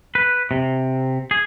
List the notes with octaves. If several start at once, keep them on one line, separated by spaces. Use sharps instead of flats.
B4
C3
G#4